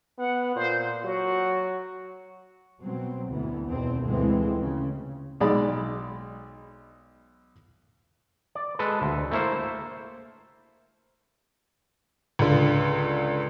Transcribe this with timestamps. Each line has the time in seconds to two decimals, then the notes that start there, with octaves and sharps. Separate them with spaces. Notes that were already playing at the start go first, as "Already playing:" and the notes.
0.18 B3 F#5
0.56 A#2 C5
1.05 F#3 F#4
2.81 B2 F#3 C4
3.30 D2 A2 E3 B3
3.69 E2 B2 D#3 E3 C4
4.04 D2 A2 E3 F3 G#3 C4
4.60 C#3
5.40 B1 G#3 D5 B5
8.55 D5
8.79 G#3 A4 B4
9.02 D2
9.31 A3 A#3 E4 A4 C5
12.39 C#2 D3